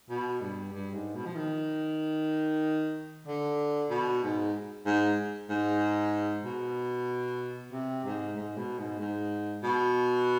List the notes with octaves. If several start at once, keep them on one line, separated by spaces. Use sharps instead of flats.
B2
G2
G2
G#2
B2
F3
D#3
D3
B2
G#2
G#2
G#2
B2
C3
G#2
G#2
B2
G#2
G#2
B2